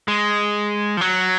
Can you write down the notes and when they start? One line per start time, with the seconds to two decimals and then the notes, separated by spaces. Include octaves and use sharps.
0.08 G#3
0.97 F3
1.01 F#3